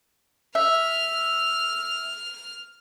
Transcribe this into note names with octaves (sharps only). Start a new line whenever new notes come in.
E5 F6